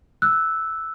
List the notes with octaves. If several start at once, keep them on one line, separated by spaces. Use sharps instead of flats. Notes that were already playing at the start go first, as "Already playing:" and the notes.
E6 F#6